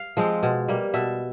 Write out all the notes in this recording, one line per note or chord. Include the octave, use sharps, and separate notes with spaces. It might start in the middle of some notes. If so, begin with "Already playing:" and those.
Already playing: F5
F3 G#3 C4
B2
G3 A#3
B2 E5